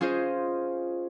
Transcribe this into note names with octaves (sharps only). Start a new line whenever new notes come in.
C#4 F4 G#4 C5 D#5